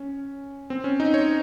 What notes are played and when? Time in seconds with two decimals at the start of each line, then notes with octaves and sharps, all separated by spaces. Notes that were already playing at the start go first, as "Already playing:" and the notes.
Already playing: C#4
0.70 C4
0.84 C#4
1.00 D#4
1.14 C#5